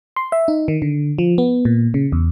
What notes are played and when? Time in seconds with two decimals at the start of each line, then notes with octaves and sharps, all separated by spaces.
0.16 C6
0.32 E5
0.48 D#4
0.68 D#3
0.82 D3
1.18 F3
1.38 B3
1.65 A#2
1.94 C#3
2.12 E2